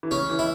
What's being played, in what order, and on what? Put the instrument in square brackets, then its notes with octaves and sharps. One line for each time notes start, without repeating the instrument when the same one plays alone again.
[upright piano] E3
[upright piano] C#3 [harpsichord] C#4
[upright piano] E3
[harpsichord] E4